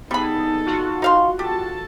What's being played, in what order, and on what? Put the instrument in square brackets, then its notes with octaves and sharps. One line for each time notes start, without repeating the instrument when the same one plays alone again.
[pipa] G3 B5 [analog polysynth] B3 G#4 [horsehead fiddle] D#4 A4
[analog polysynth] F4 F#4
[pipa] D#4 F5 C6
[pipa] G4 [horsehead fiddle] A4 A5